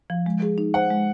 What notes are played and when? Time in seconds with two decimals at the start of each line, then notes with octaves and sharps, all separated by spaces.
0.10 F3
0.26 G#3
0.42 G#4
0.58 D#4
0.74 C5 F#5
0.90 G#3